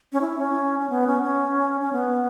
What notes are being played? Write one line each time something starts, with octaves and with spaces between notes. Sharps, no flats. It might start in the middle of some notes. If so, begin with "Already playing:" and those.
C#4
E4
C#4
C#4
B3
C#4
C#4
C#4
B3